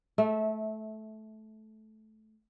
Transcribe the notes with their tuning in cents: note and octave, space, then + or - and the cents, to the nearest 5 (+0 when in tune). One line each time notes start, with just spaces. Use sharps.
A3 -15 E5 -25